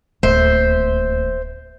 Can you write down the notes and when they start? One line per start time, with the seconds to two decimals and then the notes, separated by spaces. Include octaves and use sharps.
0.23 D1 D#2 C5 E5